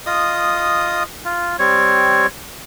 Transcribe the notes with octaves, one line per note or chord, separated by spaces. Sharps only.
F4 D#5 D#6
F4
G3 C4 C#5